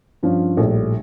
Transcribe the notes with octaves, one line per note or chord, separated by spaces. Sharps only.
G2 F3 C#4 F4
A#1 A2 G3